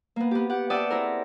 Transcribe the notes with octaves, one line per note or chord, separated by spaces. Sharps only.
A#3 B3
B3 G4
G4 F#5
D5 E5 F#5 G5 A5 D#6
C4 E4 G#4 A#4